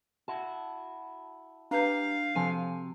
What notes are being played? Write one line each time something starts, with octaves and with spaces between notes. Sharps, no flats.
E4 F#4 A5
D4 G4 B4 F5 A#5 G6
C3 F3 F#4 A4 G#5 D#7